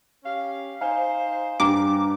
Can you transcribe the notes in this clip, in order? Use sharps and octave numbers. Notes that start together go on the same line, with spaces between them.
C#4 G4 F5
D#4 C5 F5 G#5
G2 G4 A#5 D6